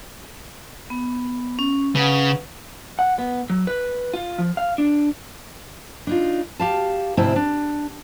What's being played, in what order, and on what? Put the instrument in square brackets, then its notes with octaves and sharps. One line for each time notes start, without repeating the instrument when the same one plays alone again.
[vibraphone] B3
C#4
[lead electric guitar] C#3 [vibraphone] B4 F#5
[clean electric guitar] F#5
B3
F#3
B4
F4
F3
F5
D4
[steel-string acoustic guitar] D4 D#4 F4
G4 F5 A5
D2 G#2 C3 C4 E4 A5
D4